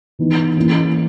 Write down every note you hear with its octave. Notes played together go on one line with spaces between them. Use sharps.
E3 B3 D#4
E3 A#3 C#4 E4